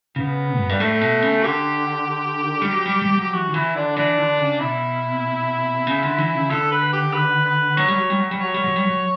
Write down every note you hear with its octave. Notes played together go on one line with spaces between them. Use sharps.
C#3 B3
F#2
G2 G3
A2 A3
B2
C#3
D3 G4
G3
F#3
G3
G3
F#3 G4
E3 F#4
D3
E3 E4
D3 D4
E3 D4
D3
C#3
B2 E4
C#3
D3
E3
C#3
D3 A4
B4
G4
B4
B4
F#3 C#5
G3
F#3
G3
F#3
G3
F#3 C#5
G3
F#3
G3
F#3